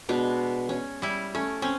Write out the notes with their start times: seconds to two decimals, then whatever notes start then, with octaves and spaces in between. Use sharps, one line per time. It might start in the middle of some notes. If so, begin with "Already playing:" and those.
0.09 B2 G#3 D4
0.69 C#4
1.02 G3 E4
1.35 A3 C#4
1.62 C4 C#4 G#5